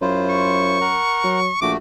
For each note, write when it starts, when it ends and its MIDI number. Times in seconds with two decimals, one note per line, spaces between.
0.02 0.99 42
0.02 0.79 64
0.02 0.79 65
0.02 0.79 72
0.30 1.57 85
0.81 1.40 70
0.81 1.40 78
0.81 1.40 82
1.24 1.49 54
1.62 1.75 34
1.62 1.77 57
1.62 1.77 66
1.62 1.72 86